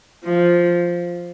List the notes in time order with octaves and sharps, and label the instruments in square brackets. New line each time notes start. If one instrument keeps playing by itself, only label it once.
[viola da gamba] F3